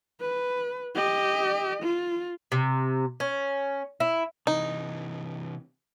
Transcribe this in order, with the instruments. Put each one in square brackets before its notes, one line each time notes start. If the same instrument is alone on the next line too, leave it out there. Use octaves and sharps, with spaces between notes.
[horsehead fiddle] B4
G4 D#5
F4
[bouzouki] C3
C#4
E4
[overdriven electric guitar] C3 E3 [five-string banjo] D#4